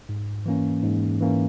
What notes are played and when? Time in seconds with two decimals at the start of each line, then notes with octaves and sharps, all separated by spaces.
0.09 G#2
0.46 E3 A#3 C#4
0.83 G#2
1.20 E3 A#3 C#4